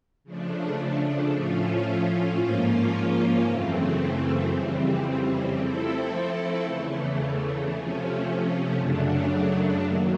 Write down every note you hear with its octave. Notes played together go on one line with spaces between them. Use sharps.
C#3 F3 A3 D4
A2 F3 A3 C#4 F4
G#2 F3 A#3 C#4 F4
F#2 C#3 E3 A3 C4
F2 C#3 E3 G3 C4
F3 A3 C4 E4 A4
E2 C#3 E3 A3
C3 F3 A3 C#4
F#2 C#3 F#3 A3 D4
D#3 F#3 A#3